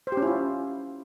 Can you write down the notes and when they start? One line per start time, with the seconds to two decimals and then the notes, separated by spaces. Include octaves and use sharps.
0.07 C5
0.12 G4
0.17 C#4
0.22 E4
0.27 F4